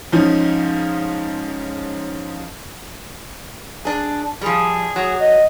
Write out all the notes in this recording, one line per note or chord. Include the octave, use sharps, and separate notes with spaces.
G#2 F3 C#4 D#4
D4 G#4
F3 G3 G#4
F#3
D#5